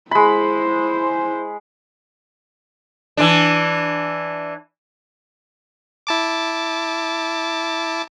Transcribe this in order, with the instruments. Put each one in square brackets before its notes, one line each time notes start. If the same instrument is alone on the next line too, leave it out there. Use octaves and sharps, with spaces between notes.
[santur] G#3 B5 [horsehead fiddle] E4 C5
[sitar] E3 D4
[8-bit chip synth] E4 A5 D6